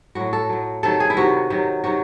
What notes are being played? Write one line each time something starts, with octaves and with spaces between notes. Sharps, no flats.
A2 F#3 F#4
A4
A2 F#3
C3 D#3 F#3 A4
G#4
E4
C3 D#3 F#3 F#4
C3 D#3 F#3
C3 D#3 F#3 F#4